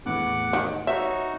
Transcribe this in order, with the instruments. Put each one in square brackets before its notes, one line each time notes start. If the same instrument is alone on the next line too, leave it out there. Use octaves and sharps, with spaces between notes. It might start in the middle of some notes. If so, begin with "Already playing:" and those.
[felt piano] E2 A2 [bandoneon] F#5 D6 F#6
[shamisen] D#3
[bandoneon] D#4 F#4 [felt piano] C#5 [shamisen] E5